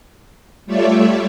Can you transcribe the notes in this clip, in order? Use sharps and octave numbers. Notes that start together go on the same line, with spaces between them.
G3 A3 F4 C#5 D5 E5